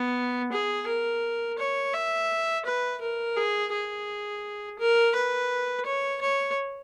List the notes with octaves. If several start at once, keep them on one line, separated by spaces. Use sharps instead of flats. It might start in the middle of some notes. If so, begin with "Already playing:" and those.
Already playing: B3
G#4
A#4
C#5
E5
B4
A#4
G#4
G#4
A#4
B4
C#5
C#5